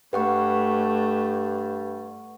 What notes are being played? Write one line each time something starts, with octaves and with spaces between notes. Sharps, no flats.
G2 A3 B4 F#5 C#6